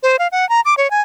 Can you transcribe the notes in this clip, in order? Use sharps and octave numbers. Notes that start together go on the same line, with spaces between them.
C5
F5
F#5
A#5
D6
C#5
G#5